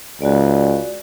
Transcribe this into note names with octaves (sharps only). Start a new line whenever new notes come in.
C#2 F#4 D5